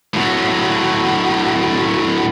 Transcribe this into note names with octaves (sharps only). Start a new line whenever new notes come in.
A2 F#3